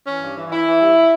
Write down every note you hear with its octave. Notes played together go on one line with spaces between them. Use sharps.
E3 C#4
G2
E3
E3 E4
E3
G2